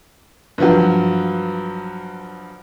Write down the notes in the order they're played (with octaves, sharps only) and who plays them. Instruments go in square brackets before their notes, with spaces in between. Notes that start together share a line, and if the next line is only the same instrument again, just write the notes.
[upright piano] G2 F3 F#3